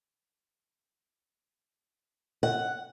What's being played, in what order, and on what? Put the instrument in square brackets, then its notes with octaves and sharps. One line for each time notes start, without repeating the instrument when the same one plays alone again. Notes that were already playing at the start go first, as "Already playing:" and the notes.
[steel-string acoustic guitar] F#5